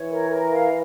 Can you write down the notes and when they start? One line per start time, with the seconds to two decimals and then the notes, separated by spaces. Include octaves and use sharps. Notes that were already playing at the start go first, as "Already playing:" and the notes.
Already playing: E3 C#5
0.11 A#4
0.31 A#4
0.52 F5